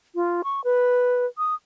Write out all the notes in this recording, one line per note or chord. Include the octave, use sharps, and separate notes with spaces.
F4
C#6
B4
D#6